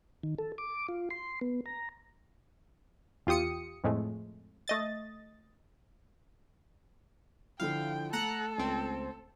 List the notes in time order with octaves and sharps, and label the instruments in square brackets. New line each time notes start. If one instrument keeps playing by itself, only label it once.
[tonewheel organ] D#3
A4
D6
F4
C6
B3
A#5
[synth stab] E2 F4 G4 D#6 C#7
F2 A2 G#3 A3
A3 D#5 A6
[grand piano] D3 F3 E4 [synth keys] F5 [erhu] G5
[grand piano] A3 [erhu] A4 [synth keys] F#5 A#5 F#6
[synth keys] C#2 C4